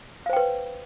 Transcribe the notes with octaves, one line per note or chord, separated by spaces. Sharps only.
B4 C5 F5 G5